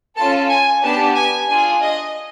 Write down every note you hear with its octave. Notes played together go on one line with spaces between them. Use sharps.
C#4 F4 A4 A5
G#5
B3 D4 G4 A5
G#5
D4 F4 G#4 G#5
D#5